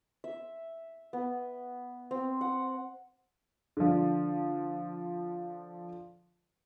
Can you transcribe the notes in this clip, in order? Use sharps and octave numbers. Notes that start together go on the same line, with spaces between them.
E5
B3
C4
F#5
D3 F3